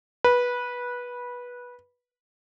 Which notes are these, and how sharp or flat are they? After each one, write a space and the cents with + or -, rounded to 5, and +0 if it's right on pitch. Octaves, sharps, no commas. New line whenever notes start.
B4 -15